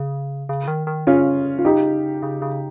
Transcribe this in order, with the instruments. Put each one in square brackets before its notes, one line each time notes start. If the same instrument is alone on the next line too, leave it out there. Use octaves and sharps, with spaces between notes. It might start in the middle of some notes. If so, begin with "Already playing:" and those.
Already playing: [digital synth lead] C#3
C#3
D#3
D#3
[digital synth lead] C#3 [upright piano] C#4 F4
[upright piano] F4
[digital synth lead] C#3 [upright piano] D#4 G4
[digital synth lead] C#3
C#3